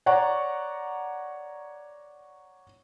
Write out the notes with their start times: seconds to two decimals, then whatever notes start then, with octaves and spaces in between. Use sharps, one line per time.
0.06 C#5 D5 F#5 A#5 C#6